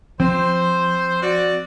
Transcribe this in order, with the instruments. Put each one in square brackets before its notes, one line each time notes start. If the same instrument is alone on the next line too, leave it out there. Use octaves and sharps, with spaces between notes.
[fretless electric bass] F3 [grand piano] C4 [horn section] C5
[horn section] F#4 D5